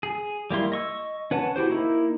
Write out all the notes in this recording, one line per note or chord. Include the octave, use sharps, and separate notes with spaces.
G#4
G3 A#3 E4 C6
D#5 C#6 E6
C#4 B4 F#5 A5
E4 F#4 G4 C5
A#3 D#4 E4